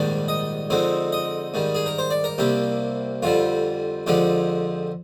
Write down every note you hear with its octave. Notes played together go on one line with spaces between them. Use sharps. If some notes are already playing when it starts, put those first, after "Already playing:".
Already playing: A#1 G#2 D#3 G3 D4
D#5
F2 D3 G#3 C4 D#4
D#5
G#2 D#3 G3
G#4
A#4
C5
D5
A#4
C2 C3 G3 A#3 G4
F2 D3 G3 F4
F2 D3 F3 G#3 G4